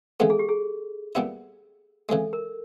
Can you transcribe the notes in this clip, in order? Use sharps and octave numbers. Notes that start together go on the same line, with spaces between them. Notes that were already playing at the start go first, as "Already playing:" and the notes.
C#3 E3 G#3 B3 A4
G#4
G4
G#4
A#2 G3 B3 E4
C#3 E3 G#3 A4
A#4